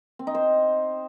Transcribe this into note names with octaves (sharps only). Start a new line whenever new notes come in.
C4
D#4
C5